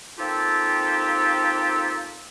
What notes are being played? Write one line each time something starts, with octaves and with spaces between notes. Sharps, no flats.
A#3 C4 D#4 F4 G4 A4